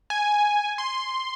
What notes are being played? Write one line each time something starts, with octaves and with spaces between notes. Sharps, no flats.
G#5
C6